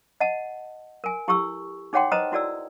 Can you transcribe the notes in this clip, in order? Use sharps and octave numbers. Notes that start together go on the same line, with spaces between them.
D#5 F#5 A5
A#4 G#5
E4 G4 A4 C#6 E6
D#4 G#4 C#5 F#5 G5 C6
B4 C5 D#5 A5 A#5 D#6
E4 F#4 A4 D5 E6